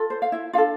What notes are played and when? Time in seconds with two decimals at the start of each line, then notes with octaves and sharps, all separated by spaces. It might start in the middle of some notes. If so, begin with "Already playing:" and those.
Already playing: F4 A4
0.10 C5
0.22 F5
0.32 E4 E5
0.53 D4 F4 A4 F5